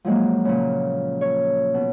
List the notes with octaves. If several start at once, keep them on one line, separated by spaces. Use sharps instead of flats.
F3 F#3 G#3 A#3
A#2 C#3
C#5
B2